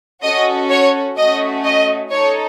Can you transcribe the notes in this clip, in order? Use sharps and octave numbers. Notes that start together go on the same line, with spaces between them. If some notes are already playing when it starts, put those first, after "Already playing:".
C#4 F#4 A4 D#5
C#5
A3 C#4 F#4 D#5
D#5
D#4 A4 C#5